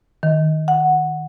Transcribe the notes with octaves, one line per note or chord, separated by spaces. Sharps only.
D#3
F#5